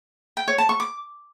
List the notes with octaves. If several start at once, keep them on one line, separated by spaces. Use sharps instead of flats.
G5
C#5
A5
C#6
D6